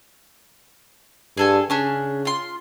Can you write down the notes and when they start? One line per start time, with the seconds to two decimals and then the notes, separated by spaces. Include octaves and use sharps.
1.37 G2 G#4 A4 G#5
1.70 C#3 C#4 D4 G#4
2.25 F4 C6